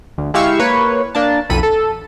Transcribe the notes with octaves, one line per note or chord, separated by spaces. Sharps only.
D2
G#3 E4 G4 F5 C#6 E6
A#3 B4 C#5
A#3 D4 A5
B1 F2 A4 B5 D#7
A4